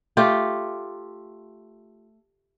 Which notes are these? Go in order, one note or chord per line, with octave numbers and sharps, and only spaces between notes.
A3 F4 G4